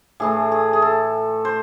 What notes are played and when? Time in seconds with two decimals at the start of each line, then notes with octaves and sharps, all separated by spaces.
0.20 A2 E3 A3 G#4
0.52 G#4
0.73 G#4
0.82 A4
1.45 C5